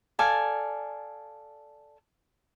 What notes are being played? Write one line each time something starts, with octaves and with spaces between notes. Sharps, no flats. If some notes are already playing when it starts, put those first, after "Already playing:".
A4 D5 F5 G#5